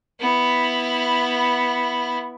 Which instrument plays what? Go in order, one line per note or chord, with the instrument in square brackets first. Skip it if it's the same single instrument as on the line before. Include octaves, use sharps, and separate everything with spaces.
[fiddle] B3 E4